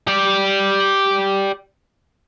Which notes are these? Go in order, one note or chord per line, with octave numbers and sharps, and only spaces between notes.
G4 D5